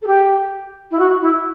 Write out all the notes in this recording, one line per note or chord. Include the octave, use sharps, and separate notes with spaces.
A4
G4
E4
F#4
E4